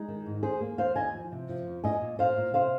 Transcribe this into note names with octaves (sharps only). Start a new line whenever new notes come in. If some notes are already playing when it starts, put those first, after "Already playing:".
Already playing: G#3 D#4 G#4
D#3
G#2
D#2 G#4 C5
A#3
D#2 C5 F5
D#2 D#5 G#5
F3
C3
F3
F2
A#2 D#5 G#5
A#2
A#2 C5 F5
A#2
C3 C5 F5